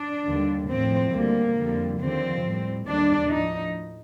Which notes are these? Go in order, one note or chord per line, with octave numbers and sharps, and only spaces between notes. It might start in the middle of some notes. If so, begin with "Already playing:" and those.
Already playing: D4
D#2 D3 G3
A2 F3 C4
D2 D3 G3 A#3
F2 D3 G3
D#2 D3 F3 C4
A2 G3
D#2 D3 G3 D4
A2 F3 D#4